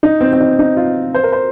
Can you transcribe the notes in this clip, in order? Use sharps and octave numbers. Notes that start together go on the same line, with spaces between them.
D#4
C4
C4
D#4
D#4
F4
C5
A#4
C5